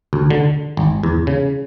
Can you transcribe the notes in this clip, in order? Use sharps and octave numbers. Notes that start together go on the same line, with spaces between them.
D2
D3
G#1
E2
C#3